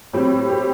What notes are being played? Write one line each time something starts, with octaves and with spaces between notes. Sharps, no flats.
A2 F#3 C4 G4
G4